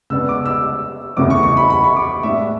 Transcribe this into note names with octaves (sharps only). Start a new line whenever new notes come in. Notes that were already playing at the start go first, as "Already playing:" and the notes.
C#3 G#3 B3 D4 E6
D6
E6
E2 C#3 E3 A3 D6
C#6
C#6
B5
B5
C#6
D6
A2 G#3 D4 E5